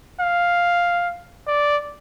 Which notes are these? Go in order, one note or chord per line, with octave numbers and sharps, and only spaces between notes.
F5
D5